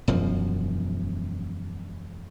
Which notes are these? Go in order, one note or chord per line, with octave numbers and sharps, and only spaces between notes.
E1 F#2 F3